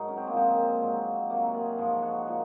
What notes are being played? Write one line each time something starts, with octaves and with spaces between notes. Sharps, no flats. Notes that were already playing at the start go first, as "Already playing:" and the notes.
Already playing: G#2 F#3 D#4 G#4 A#4
C#4
C4
A#3
A#2 F3 G#3 C4
G#2 F#3
C3 F#3 A#3
F#4
F4 G#4
G#2 F3 F4 G#4
D#4 F#4
A#2